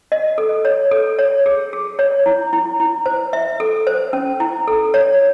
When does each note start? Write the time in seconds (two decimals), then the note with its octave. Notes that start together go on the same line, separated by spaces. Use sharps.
0.12 D#5
0.38 A4
0.65 C#5
0.91 A4
1.19 C#5
1.46 G#4
1.73 G#4
1.99 C#5
2.26 E4
2.53 E4
2.80 E4
3.06 C5
3.33 E5
3.60 A4
3.87 C5
4.13 C#4
4.40 E4
4.68 A4
4.94 C#5